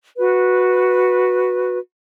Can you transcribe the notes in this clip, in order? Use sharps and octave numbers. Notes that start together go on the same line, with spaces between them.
F#4 B4